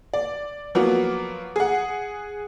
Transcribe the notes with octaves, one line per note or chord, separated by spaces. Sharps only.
D5
F3 F#3 A#3 B3
G#4 F#5